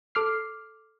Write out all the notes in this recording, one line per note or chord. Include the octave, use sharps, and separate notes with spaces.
A4 D6 F6 C7